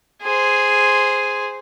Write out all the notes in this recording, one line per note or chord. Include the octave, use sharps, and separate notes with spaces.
G#4 C5